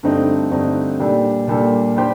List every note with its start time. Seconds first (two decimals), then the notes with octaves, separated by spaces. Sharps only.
0.03 G2 D3 A3 C4 D#4
0.51 G2 D3 A3 C4 D#4
0.99 A#2 G3 D4 A4
1.47 A#2 G3 D4 A4
1.96 G3 D4 G4 C5